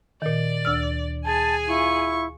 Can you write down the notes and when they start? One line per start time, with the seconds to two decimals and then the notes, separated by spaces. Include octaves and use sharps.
0.22 A#2 D#3 D5
0.65 D2 E6 F6
1.25 G#4 G#5 A5
1.67 E4 F4 C#6